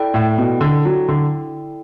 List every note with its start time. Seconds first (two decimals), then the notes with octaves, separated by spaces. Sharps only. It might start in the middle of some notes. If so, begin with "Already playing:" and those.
Already playing: E4 A4 D5 G5
0.14 A2
0.38 B2
0.61 D3
0.85 F#3
1.08 D3